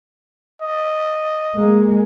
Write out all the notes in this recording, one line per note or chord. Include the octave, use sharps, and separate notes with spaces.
D#5
G#3 A#3